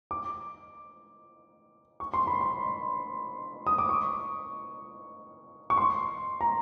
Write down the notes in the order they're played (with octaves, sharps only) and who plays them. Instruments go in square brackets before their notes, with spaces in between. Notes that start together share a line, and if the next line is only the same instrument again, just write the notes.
[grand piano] D6
C#6
C6
B5
C6
D#6
D6
C#6
C#6
C6
A#5